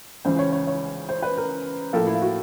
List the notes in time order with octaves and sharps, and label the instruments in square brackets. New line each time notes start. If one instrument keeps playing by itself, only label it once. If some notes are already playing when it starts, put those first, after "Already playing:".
[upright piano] C#2 C#3 E3 C5
C#5
C#5
C#5
C5
B4
A#4
A2 F3 A#3 A4
E4
F4
F#4